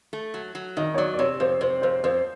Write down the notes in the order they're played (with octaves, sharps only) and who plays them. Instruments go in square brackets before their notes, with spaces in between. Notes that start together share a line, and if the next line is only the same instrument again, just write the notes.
[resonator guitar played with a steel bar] A3
F#3
F#3
[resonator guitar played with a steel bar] D#3 [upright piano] D#5
[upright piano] C#5
[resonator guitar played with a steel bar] F#3 [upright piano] D5
[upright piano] D5
[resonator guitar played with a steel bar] C3 [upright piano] C#5
[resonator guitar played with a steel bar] F2 [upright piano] C5
[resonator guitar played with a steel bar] C3 [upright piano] C5
[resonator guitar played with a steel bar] F2 [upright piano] C5
[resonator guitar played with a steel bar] F2 [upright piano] C5